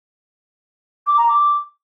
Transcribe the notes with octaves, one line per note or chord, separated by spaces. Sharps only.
D6
A#5
D6